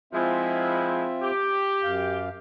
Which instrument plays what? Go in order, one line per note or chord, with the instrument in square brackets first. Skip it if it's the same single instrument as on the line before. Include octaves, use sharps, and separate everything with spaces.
[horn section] F3 G#3 E4 [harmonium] C4 F4 E5
[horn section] G4
[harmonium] F#2 F5